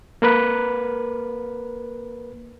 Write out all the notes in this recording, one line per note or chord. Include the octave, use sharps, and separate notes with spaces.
A#3 A#4 B4